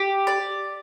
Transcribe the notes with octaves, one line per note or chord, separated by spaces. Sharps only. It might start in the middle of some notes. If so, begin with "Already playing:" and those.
Already playing: G4
D5